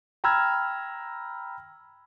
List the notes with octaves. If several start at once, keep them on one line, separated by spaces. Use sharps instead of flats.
G5 A#5 B5 E6 F6 G#6